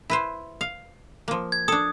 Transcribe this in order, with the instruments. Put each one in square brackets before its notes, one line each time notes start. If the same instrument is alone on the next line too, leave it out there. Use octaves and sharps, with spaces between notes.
[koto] E4 B4 C5
F5
F3 A#3
[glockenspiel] G#6
[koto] D4 A4 [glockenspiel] D#6